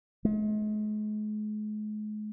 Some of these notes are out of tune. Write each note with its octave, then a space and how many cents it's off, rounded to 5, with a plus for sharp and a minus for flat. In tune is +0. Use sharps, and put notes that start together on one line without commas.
G#3 +40